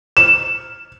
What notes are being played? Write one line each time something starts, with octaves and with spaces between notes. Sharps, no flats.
E7